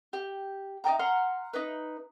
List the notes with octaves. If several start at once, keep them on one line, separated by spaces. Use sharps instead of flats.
G4
D#4 D#5 G5 A#5
F#5 A#5 C6 F6
D#4 B4